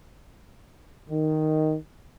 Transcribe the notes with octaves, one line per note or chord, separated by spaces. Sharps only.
D#3